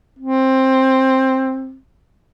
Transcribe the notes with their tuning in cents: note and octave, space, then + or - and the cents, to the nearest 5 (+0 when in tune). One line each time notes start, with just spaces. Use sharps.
C4 +10